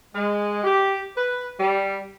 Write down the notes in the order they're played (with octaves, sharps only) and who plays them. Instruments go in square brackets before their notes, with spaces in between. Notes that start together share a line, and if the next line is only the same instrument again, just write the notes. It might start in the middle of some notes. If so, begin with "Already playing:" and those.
[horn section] G#3
G4
B4
G3